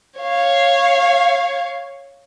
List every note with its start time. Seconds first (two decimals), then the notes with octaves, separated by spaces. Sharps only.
0.20 C#5 F5